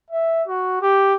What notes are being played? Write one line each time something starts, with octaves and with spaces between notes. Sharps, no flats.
E5
F#4
G4